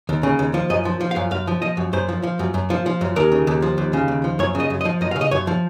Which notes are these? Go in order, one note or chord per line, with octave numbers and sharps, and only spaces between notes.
D#2
C#3
D#2
F3
F#2 D#5
F3
F3
F5
F#2
F#2 F5
F3
F3 D#5
F#2
F#2 C5
F3
F3
F#2
F#2
F3
F3
F#2
D#2 A#4
C#3
D#2
F3
D#2
C#3
D#2
F3
F#2 C#5
C#3
D#5
F#2
D#5
F3
F#2 D#5
F5
C#3
D#5
F#2 C#5
F3